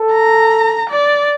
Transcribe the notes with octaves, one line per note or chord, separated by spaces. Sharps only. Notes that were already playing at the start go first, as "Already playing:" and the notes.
Already playing: A4
A#5
D5